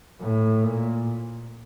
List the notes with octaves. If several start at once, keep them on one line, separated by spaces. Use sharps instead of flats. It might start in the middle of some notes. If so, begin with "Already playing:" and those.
A2
A#2